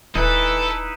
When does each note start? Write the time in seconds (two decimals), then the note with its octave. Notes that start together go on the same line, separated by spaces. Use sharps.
0.15 D#1 E3 D#4 E4 A4 B4